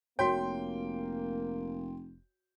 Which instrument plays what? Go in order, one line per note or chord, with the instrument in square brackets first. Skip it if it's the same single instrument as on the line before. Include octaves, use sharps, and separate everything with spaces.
[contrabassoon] F1 [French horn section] A#3 [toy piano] F#4 C#5 [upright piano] G5 C6